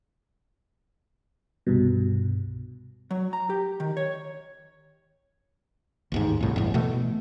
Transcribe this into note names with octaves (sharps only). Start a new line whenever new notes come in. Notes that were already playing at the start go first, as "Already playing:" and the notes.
C2 G2 B2
F#3
A#5
G4
D#3
C#5
A1 D#2 G#2
C2 A2
G1 E2
B2 E3 A3